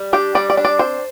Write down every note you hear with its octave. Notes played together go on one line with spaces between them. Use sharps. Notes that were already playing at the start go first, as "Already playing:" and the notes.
Already playing: G3
D4 G4
G3 D5
D5
D4
D5
C4 C5